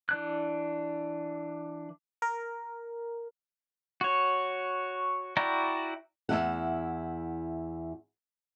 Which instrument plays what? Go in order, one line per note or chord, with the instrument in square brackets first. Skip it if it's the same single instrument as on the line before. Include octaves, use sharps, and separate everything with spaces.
[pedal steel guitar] E3 D4 F#6
[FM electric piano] A#4
[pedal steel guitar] F#4 C#5
E4 F#4 D5 G5 A#5
[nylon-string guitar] E2 E3 E4 F#5